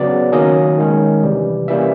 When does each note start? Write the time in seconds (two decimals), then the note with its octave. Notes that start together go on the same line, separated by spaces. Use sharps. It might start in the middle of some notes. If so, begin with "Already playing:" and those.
Already playing: C#3 F#3 B3 D5
0.32 D#3 F#3 A#3 C#4 D#5
0.78 D#3 G#3 C#4
1.23 C3 E3 G3
1.68 E3 G3 A#3 C#4 E5